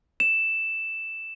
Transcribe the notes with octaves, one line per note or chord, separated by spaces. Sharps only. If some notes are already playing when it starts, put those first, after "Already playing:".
E7